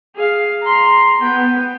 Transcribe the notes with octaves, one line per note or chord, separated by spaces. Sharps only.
G#4 F5
A#5 C6
B3 G5